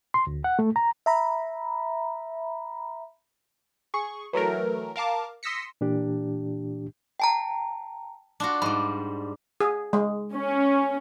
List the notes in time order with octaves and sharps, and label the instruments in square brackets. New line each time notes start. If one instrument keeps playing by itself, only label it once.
[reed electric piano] C6
D2
F#5
A3
A#5
[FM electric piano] E5 A#5 B5
[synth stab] G#4 C#6
E3 F#3 A3 A#4
A#4 F5 A5 D6
C6 D#6 E6 A#6 B6 C#7
[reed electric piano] A#2 E3 D4 G4
[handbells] G5 A5 A#5
[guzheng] D4 F4 F#4
[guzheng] G#2 G3 [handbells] B5
[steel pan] G#4
G#3
[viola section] C#4